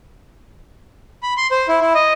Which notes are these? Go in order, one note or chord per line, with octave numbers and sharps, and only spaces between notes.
B5
C6
C5
E4
E4
D#5